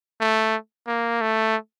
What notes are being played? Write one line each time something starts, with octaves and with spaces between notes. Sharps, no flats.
A3
A#3
A3